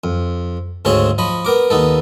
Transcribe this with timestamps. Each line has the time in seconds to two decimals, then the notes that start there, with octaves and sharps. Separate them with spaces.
0.04 F2
0.85 D2 G#2 C#3 C4 C5 C#5
1.18 F3 D#5 B5
1.45 B3 A#4 D6
1.70 D#2 B3 D#4 A4